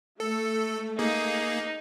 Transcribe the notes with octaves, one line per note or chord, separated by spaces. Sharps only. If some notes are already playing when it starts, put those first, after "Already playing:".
A3 A4
A#3 D#4 G#4